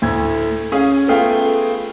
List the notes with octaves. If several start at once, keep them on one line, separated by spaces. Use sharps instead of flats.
D2 A2 G#6
C#4 G#4 F5
A3 B3 F4 G#4 F5 G5